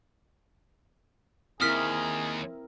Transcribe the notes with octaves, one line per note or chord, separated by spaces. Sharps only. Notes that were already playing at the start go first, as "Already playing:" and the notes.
D#2 C4 E4 G#4 A#4 D#6 F6 B6